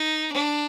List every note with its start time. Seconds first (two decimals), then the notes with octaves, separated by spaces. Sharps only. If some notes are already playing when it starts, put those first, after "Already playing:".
Already playing: D#4
0.32 D4